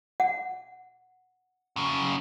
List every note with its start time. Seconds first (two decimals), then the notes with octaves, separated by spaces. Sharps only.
0.20 F#5
1.76 F#2 C#3